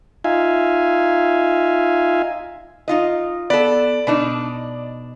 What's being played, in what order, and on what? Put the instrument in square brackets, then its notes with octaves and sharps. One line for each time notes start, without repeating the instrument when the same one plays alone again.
[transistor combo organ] D#4 F4 E5 F5 G#5
[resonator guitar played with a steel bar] D#4 F4 D#5
[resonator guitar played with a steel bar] B3 A4 [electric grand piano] D5
[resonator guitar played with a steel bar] B2 D4 D#4